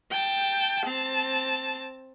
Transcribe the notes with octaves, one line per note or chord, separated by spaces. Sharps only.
G5 A5
C4 A5